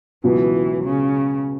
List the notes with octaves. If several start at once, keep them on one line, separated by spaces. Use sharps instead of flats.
C#2 B2 E3 F#3 B3
C#3